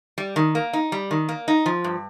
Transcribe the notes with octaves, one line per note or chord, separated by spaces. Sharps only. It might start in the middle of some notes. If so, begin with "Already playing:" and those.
G3
D#3
A#3
D#4
G3
D#3
A#3
D#4
F3
G2